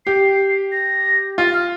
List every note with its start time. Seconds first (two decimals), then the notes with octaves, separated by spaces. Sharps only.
0.06 G4 C7
0.72 A#6
1.38 F4 A6
1.54 F6